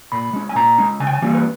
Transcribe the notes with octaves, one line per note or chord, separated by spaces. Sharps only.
A#2 B5
G#3 C#4
G#5
A#2 A#5
G#3 C#4
C#3 G#5
G5
G#5
E3 G3 A#3 C#4
B4